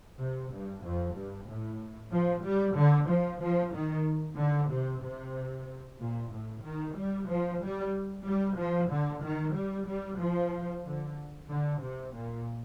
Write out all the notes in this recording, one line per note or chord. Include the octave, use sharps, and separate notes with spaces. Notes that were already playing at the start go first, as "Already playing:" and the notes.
C3
G2
F2
G2
A2
F3
G3
D3
F3
F3
D#3
D3
C3
C3
A#2
A2
D#3
G3
F3
G3
G3
F3
D3
D#3
G3
G3
F3
D3
D3
C3
A#2